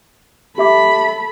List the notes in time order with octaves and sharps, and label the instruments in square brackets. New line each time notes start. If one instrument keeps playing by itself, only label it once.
[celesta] G4 E5 D6 [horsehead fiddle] A4 B5